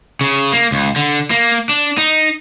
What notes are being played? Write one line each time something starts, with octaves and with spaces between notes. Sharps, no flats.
C#3
A#3
C#2
D3
A#3
D4
D#4